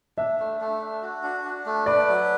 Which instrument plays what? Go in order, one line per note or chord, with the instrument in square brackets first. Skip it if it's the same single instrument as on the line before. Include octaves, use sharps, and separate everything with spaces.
[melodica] D4 [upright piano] E5
[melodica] A3
A3
D4
F#4
D4
D4
A3
[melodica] B4 [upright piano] D5
[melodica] F#3